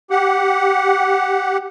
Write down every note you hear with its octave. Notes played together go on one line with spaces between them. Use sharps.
G4 F#5